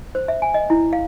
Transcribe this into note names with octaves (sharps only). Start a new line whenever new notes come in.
C5
E5
G#5
D#5
E4
F5